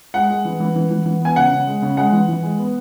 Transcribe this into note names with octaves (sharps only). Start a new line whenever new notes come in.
G#3 F#5
G#3
E3
E3
E3
E3
E3
B3 G#5
C#3 F#5
C#3
G#3
C#3
G#3 F#5
E3
E3
G#3
B3